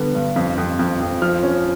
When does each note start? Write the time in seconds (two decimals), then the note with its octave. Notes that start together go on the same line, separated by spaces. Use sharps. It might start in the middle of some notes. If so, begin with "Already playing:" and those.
Already playing: D3 G3 B3
0.15 G2
0.36 F2
0.58 F2
0.79 F2
1.00 F2
1.22 F3 F6
1.43 C#4